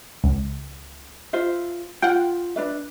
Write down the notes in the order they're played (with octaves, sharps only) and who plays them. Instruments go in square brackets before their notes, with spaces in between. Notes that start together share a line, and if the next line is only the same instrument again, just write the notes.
[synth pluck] C#2
[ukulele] F4 C5 E5
[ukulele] F4 [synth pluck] F#5 G5
[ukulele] D4 B4 E5